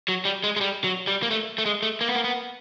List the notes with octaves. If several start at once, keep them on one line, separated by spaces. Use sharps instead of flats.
F#3
G3
G#3
G#3
G3
F#3
G3
A#3
A3
A3
G#3
A3
A#3
B3
A#3
B3